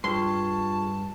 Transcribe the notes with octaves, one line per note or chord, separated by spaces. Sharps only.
G2 F4 G#4 A5 C6 C#6